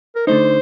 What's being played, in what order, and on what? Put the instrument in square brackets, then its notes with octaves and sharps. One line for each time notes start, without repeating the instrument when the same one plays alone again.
[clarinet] A#4
[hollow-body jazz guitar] D3 A3 D#4 [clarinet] C5